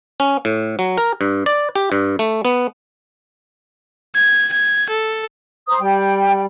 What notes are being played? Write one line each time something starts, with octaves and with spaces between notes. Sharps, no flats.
C#4
A2
F#3
A#4
G2
D5
G4
G2
A3
B3
G#6
G#6
A4
C5 A#5 D#6
G3 G5